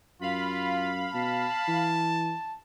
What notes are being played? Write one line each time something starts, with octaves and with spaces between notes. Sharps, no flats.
F#2 F4 F5 B5
B2 A5
E3